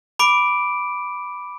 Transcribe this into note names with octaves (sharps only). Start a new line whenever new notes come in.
B5 D6 D7